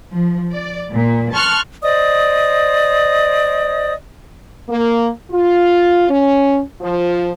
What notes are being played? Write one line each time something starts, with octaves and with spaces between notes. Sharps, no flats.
F3
D5
A#2
A5 C6 C#6 F6 F#6
C5 D5 D#5 D#6
A#3
F4
C#4
F3